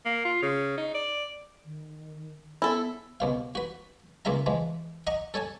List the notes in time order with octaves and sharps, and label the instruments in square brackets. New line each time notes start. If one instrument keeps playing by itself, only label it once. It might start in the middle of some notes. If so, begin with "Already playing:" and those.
[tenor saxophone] A#3
F4
C#3
D#4
D5
[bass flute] D#3
[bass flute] B3 [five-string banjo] E4 A4
[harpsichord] C2 B2 F5
F#4 B4
C#2 A#3 F4 G#4 E5 A#5
E3 F3 G#3
D#5 F#5 A#5 C#6
A4 C#5 G#5 A5